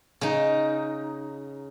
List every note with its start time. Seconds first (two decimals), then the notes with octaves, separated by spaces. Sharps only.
0.21 C#3 D#4